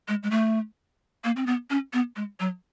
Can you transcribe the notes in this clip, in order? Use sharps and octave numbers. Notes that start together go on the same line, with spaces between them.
G#3
G#3
A3
A#3
C4
B3
C#4
B3
G#3
F#3